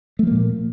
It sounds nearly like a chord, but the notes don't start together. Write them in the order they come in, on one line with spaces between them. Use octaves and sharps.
A3 F3 A#3 A#2